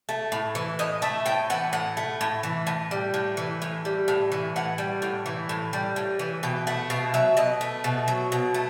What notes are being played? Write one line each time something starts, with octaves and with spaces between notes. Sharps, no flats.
A3
A2
E3
A2 D#5
A3 E5
A2 G5
E3 F#5
A2 F#5
A3
A2
E3
A2
G3
A2
E3
A2
G3
A2
E3
A2 F#5
G3
A2
E3
A2
G3
A2
E3
B2 G5
A3 F#5
B2 F5
F#3 E5
B2 D#5
A3
B2
F#3
B2
A3